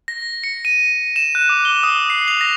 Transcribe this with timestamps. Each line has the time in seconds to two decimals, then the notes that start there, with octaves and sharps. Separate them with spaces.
0.08 A#6
0.44 C#7
0.65 D#7
1.16 E7
1.35 F#6
1.49 D6
1.65 G7
1.83 D#6
2.10 C7
2.28 F7
2.41 A#6